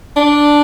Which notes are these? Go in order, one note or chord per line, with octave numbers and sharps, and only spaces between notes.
D4